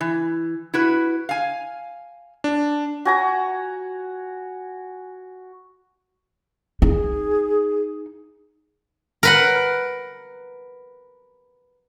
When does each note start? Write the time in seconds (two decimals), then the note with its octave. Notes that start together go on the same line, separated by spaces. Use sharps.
0.01 E3
0.74 E4 F#4 B4
1.29 F5 G#5
2.44 D4
3.05 F#4 G#5 A#5
6.82 D#4 G#4
9.23 A#4 B4 F#5